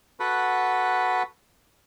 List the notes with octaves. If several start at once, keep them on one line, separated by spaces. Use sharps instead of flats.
F#4 A4 B4 F#5